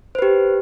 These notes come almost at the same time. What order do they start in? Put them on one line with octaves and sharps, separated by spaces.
C5 B4 G4